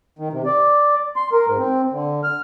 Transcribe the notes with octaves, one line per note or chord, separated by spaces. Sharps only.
D#3
C3
D5
C6
A#4
G#2
C4
D3
F6